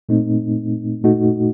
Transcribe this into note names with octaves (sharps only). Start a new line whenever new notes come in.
A#2 A3 C4 D#4
A#2 A3 D#4 F#4